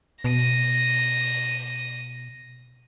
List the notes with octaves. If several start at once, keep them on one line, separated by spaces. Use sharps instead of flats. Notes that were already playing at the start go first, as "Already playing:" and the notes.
B2 A#6 D#7